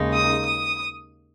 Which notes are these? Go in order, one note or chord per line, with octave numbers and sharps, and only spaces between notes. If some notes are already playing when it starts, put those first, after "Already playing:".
Already playing: D#2 C#3 G#3 D#4
D#6
D#6